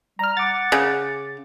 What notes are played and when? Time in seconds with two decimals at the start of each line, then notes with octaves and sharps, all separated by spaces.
0.19 G3 A#5 F6
0.37 F#5 D6 A6
0.72 C#3